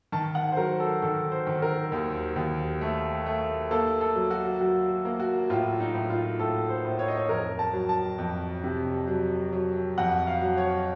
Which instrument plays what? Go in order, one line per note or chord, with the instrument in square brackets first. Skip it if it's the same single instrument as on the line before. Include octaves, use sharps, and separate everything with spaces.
[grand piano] D#3 A5
F#5
C5
F#3 A#4
A4
D#3 A4
C5
D#3
A#4
D#2
D#2
A3
A3
A#3 A4
A4
F#3
F#4
F#3 F#4
A#3
F#4
A2 F4
D#4
A2
F4
A2 A4
C5
A2
C#5
D#5
C#5
F2 A#4
A5
F#3
A5
F2
C3
F#3
F#3
F2 F#5
F5
F#3
C#5